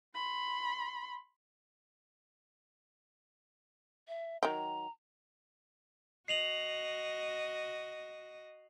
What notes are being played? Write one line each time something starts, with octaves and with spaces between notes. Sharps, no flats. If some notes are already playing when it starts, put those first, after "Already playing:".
B5 C6
E5
D#3 F#3 G5 A#5
F#4 D#5 C7 F7 F#7